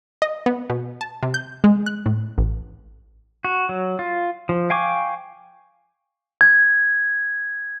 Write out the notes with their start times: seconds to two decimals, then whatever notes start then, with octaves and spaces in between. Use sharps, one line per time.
0.22 D#5
0.46 B3
0.70 B2
1.01 A5
1.23 C3
1.34 G6
1.64 G#3
1.86 F#6
2.06 A2
2.38 A1
3.45 F#4
3.69 F#3
3.99 F4
4.49 F3
4.70 F5 G5 G#5 C#6 D6
6.41 G#6